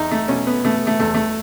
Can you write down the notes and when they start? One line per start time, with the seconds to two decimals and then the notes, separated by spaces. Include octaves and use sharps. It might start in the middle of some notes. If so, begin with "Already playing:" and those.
Already playing: E2 D#4
0.11 A3
0.28 B2 C#4
0.47 B3
0.64 B2 A3
0.87 A3
1.00 E2 A3
1.15 A3